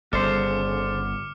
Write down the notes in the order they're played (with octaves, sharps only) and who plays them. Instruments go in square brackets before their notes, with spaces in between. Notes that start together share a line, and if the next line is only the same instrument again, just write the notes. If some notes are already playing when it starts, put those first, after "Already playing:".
[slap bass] G1 [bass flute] C#3 [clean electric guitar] A4 C5 [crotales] D6 F6 C#7